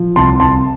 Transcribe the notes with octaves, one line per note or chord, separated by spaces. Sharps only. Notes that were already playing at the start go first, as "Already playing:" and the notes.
Already playing: F3
C2 A5 C6
C2 A5 C6